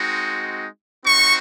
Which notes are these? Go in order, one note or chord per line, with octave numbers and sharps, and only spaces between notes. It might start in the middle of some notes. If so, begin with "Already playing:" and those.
Already playing: G#3 C4 D#4 F#4
C4 D#4 F#4 C#6